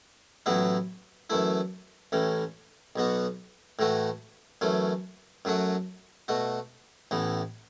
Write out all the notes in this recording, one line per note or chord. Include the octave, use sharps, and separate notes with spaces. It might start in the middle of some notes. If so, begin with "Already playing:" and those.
A1 A2 F#3 B3 E4
F#2 E3 A3 E4
A1 A2 E3 C#4
B1 B2 B3 F#4
A2 E3 A3 F#4
F#2 E3 A3 C#4
F#2 F#3 A3 F#4
B2 A3 F#4
A1 A2 E3 B3